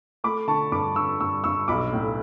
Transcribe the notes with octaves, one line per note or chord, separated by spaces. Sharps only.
A3 B5 D6
D3 A5 C#6
G2 B5 D6
D3 C#6 E6
G2 C#6 E6
G2 C#6 E6
B1 B5 D6
A2